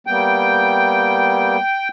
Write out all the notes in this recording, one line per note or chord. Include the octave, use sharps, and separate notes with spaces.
G3 A#3 B3 G5